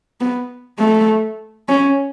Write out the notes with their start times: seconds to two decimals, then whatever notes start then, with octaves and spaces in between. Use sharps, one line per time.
0.21 B3
0.79 A3
1.69 C#4